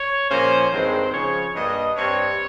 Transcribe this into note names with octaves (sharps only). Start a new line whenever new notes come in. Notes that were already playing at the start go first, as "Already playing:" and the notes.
Already playing: C#5
A#2 F3 A#3 C#4 C5
G2 D#3 G#3 C4 C5
C#3 F3 G#3 C#5
G2 G3 A#3 D#5
G2 G3 C4 C#5